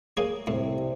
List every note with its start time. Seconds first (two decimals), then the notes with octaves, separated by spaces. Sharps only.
0.17 A#3 G#4 C#5
0.47 C2 A2 C3